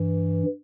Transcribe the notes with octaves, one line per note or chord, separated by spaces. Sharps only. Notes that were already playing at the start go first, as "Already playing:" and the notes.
Already playing: G2 E3